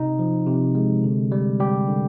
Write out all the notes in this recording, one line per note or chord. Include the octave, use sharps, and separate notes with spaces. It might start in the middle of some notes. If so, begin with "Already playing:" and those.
Already playing: C3 D#4
F3
C3
G#3
D3
G3
G3 G4
D3